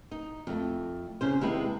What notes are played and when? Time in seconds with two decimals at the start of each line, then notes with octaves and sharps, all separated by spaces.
0.11 D#4
0.47 F2 A3
1.21 C#3 C#4 C5
1.41 D#2 C3 G#3 E4 B4